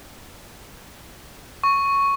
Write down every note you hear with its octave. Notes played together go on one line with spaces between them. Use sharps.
C#6